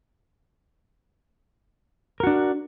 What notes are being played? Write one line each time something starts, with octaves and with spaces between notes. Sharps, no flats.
D4 F#4 A#4